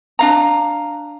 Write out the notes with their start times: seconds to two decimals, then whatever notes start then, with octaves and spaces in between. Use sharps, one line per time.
0.19 D4 F5 A#5